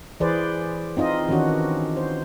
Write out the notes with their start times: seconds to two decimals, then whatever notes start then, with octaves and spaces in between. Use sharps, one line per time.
0.20 E3 G#4 B4 C5 D5
0.97 C4 D#4 F4 D#5
1.29 D#3 E3 C#4 D4 F#4
1.97 C5